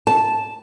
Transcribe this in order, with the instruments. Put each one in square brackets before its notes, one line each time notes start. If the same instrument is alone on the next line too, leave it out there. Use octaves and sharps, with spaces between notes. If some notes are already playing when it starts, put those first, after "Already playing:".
[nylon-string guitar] A5